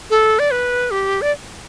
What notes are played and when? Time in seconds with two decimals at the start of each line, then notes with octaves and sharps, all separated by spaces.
0.10 A4
0.39 D5
0.51 B4
0.91 G4
1.22 D5